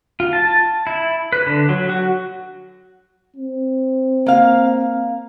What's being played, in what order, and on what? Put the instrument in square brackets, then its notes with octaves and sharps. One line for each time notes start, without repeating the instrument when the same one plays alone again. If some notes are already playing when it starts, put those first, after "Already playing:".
[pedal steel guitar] F4
A5
E4
B4
D3
F#3
F#4
[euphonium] C4
[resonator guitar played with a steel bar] A#3 F5